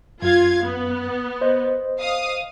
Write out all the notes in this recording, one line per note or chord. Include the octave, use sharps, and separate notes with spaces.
F#2 F4 F5 G#6
B3
C5 D#5
F5 D#6